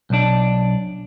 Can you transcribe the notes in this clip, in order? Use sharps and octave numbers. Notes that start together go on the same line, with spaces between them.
B1 D4